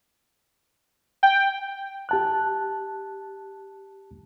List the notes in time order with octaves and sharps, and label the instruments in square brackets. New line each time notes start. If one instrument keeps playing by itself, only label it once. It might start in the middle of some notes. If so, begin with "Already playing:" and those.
[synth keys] G5
[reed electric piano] G4 A5 F#6